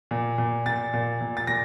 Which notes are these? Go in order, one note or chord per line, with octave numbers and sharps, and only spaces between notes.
A#2
A#2
A#2 A6
A#2
A#2
A6
A#2 A#6